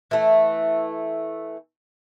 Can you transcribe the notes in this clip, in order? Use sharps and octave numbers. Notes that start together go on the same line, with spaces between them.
E3 A3